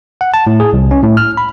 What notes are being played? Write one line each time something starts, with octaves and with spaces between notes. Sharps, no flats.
F#5
A5
A2
G#4
C2
C#4
A2
F6
B5